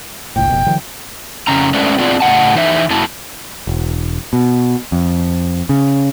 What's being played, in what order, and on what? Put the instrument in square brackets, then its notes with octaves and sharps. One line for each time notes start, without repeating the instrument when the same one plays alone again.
[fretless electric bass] G1 C#2 A2 [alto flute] G5
[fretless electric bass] F1 F2 B2
D3 E3 F#3
[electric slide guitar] F2 G#2 C#3 C#4 A#5
G#3 A3 C#4 D4 B4 C5
B3 C4 D4 F4 G#4 B4
A2 C#3 F#5 A5
E3 D#4 C5 E5
F#2 C#3 F#3 A#3 E4 A5
[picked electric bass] E1
B2
F2
C#3